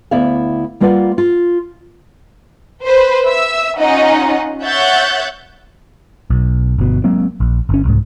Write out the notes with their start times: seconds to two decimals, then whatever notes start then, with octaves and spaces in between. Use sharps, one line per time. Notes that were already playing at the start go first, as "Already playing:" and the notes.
0.11 D2 B3 E4 D5 E5 F5
0.80 G3 A#3 F4 B4 D5 F#5
1.18 F4
2.84 B4 C5
3.27 E5 E6
3.78 C#4 D#4 F4 D#5 F#5
4.65 C#5 E5 F#5 F#6 G6 A6
6.30 B1
6.78 G1 B2
7.04 F#3 G#3 A#3 C4
7.40 A#1
7.69 G1 C#4
7.85 C2 G#2